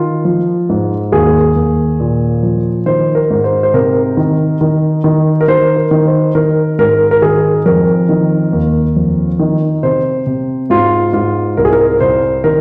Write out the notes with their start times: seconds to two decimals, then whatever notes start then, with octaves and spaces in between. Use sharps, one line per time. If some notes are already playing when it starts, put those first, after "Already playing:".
Already playing: D#3 F4
0.25 F3
0.69 G#2
1.12 D#2 G#4
1.56 D#2
2.00 A#2
2.43 F3
2.86 D#3 C5
3.15 A#4
3.30 G#2
3.44 C5
3.63 C5
3.74 C3 A#4
4.17 D#3
4.61 D#3
5.04 D#3
5.41 A#4
5.48 D#3 C5
5.76 A#4
5.91 D#3
6.06 C5
6.35 D#3 A#4
6.78 G#2 A#4
7.11 A#4
7.22 D#3 G#4
7.66 F2 A#4
8.09 D#3
8.52 D#2
8.96 F2
9.39 D#3
9.83 C3 C5
10.26 C3
10.70 G#2 F4
11.13 G#2 F4
11.57 C2 A#4
11.65 G#4
11.73 A#4
12.00 C2 C5
12.44 D#3 A#4